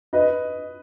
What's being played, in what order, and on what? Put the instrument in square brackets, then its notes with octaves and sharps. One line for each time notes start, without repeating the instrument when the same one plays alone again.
[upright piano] B4 D#5